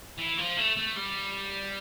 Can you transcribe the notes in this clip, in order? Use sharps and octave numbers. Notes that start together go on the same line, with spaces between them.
E3
F3
A3
A3
G3